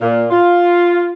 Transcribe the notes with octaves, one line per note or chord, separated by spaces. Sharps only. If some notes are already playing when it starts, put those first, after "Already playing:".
A#2
F4